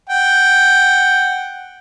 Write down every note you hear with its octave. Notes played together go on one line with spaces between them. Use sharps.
F#5 G5